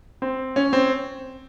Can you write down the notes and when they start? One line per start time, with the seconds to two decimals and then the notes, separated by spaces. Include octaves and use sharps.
0.22 C4
0.56 C#4
0.73 C4